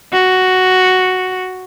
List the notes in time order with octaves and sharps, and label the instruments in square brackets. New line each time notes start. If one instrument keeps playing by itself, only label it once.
[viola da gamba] F#4